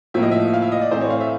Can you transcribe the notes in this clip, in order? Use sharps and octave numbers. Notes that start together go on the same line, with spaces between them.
A2 F3 A#3 E5
D#5
E5
F5
E5
D#5
D5
A2 E3 A3 C4 C5
C#5
F5
E5